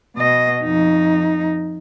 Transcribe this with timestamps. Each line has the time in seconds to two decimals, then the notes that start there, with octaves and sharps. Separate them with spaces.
0.16 B2 D#5
0.63 F2 D#4